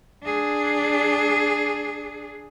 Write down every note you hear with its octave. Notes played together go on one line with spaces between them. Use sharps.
D4 G#4